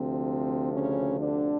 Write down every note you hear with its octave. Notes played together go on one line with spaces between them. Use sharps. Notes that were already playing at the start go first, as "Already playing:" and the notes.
Already playing: D2 C3 F3 C4
C#3 C#4
D3 D4